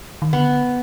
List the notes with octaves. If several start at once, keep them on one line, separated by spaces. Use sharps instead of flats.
D#3
D3 B3